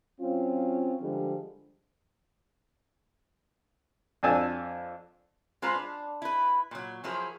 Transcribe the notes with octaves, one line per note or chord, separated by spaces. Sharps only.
F#3 C4 C#4 F4
D3 F3 G3 G#3 D4
F2 D4 D5 G#5 A5 E6
G#3 F4 B4 C5 A#5
D4
E4 B4
A#2 F#3
F3 F#3 E4 G#4 A#4 C5